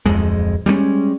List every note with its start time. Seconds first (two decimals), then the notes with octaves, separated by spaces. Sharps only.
0.06 D1 F2 G#3
0.66 G3 G#3 A#3 C#4